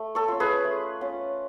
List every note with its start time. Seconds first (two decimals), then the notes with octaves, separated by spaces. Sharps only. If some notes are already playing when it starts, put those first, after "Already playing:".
Already playing: A3
0.15 A4 C#5
0.28 C#4 F4
0.40 G#4 B4
0.64 A3
1.01 C#4 F4